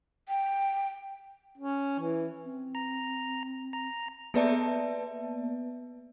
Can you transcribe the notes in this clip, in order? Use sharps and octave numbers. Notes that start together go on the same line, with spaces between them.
G5
C#4
E3
C4
A#5
A#5
A#3 B3 B4 D5 E5 A5